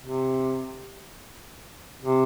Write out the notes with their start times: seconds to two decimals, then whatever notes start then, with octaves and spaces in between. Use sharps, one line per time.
0.02 C3
2.02 C3